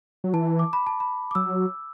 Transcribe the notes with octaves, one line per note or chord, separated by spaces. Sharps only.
F#3
E3 A5
D6
B5
A5
B5
D6
F#3 E6